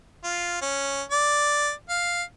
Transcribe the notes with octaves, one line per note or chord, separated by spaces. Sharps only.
F4
C#4
D5
F5